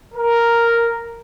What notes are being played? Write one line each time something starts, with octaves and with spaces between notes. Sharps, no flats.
A#4